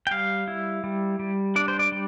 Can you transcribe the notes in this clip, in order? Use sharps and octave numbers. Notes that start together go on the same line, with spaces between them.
G5
G3 F5
E4
G3
G3
D4 D5
C5
D5
G3